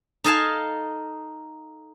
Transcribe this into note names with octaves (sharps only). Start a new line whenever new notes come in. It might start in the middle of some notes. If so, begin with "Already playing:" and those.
D#4 A4 D#5 F5 G#5 A5